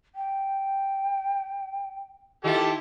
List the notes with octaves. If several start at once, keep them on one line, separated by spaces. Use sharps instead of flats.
G5
D#3 E4 F4 G4 A4